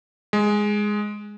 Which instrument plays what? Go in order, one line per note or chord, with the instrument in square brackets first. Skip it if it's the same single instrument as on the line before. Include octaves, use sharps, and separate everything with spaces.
[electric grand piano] G#3